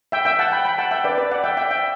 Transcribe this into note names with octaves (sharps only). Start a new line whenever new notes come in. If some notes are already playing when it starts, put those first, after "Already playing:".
E5 G5
E5 G5
F#5 A5
G5 B5
G5 B5
F#5 A5
E5 G5
B4 D5
B4 D5
D5 F#5
E5 G5
E5 G5
E5 G5